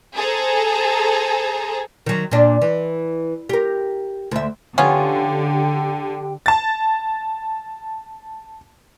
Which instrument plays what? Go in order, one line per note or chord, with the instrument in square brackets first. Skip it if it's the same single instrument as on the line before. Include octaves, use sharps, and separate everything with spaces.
[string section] G#4 A4 C5 A#5
[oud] D#3 F#3
A#2 D4
E3
G4 A#4
D2 E5
[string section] D3 [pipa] B3 C#4 F4 [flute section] G4 G5
[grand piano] A5 A6